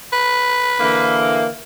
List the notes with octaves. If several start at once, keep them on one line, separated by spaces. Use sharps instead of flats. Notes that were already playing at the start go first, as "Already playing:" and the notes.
B4
D3 E3 A#3